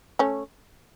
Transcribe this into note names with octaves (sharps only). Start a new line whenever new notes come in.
A3 C#4